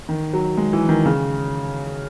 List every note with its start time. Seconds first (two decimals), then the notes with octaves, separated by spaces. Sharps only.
0.09 D#3
0.33 F#3
0.57 G#3
0.73 E3
0.89 D#3
1.05 C#3